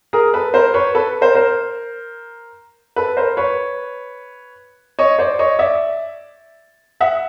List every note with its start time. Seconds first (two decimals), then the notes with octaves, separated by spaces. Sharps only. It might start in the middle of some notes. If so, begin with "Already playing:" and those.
0.13 G#4 A#4
0.34 A4 B4
0.54 A#4 C5
0.74 B4 C#5
0.95 A4 B4
1.21 A#4 C5
1.35 A#4 C5
2.96 A4 B4
3.17 A#4 C5
3.37 B4 C#5
4.99 C#5 D#5
5.19 C5 D5
5.39 C#5 D#5
5.59 D5 E5
7.01 E5 F#5